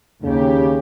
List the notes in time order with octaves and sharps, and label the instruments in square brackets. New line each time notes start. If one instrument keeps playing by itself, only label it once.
[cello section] D#2 G4 [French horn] C#3